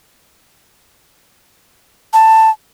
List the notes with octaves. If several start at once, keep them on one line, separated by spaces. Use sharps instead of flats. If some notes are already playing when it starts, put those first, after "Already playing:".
A5